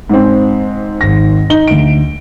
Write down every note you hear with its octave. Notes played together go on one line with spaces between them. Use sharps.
G#2 C4
G#1 A#6
D#4 G7
D2 D7